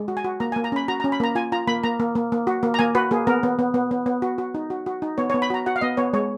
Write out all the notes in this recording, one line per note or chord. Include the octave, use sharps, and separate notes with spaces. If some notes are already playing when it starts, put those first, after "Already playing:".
Already playing: G#3
F#4
G#5
F#4
A#3 A#5
G#5
A#3
A#5
C#4 B5
F#4 A#5
A#5
C#4
B5
A#3 A#5
F4 G#5
F4 A#5
A#3 B5
A#3 A#5
A#3
A#3
A#3
F#4
A#3
A#5
A#3 G#5
F#4 B4
A#3 G#4
B3 A#4
B3
B3
B3
B3
B3
F#4
F#4
D#4
F#4
F#4
D#4
B3 C#5
C#5
B3
B5
F#4 A#5
F#4 F#5
F5
B3 D#5
B3 C#5
G#3 C#5